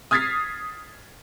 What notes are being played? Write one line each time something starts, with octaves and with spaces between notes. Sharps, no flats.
D#6 F6 G#6 A6 B6 C7